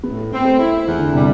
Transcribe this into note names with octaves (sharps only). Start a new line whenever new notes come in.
A2 B3
C4
A3
E4
E2 E3
D3
C3 G3